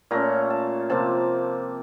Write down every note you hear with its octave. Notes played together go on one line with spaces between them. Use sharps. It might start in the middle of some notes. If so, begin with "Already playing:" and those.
A#2 A3 C#4 A#5
A5
C3 F3 A#3 A5